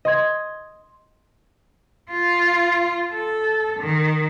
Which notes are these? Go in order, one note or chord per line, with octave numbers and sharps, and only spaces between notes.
D#5 C6 G#6
F4
A4
D#3